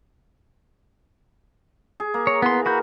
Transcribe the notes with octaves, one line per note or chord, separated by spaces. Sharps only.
G#4
A#3
C#5 A#5
E3 B3 C6
F#4 A#4 B5 G6